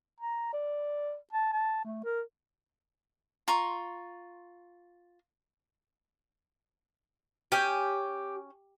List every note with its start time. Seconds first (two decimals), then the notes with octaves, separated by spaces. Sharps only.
0.20 A#5
0.53 D5
1.33 A5
1.53 A5
1.85 A3
2.04 A#4
3.48 F4 A#5 C6 C#6
7.52 C#4 G4 G#5 G6